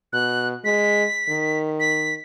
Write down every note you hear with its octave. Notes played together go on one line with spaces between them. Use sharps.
B2 F#6
G#3 B6
D#3
B6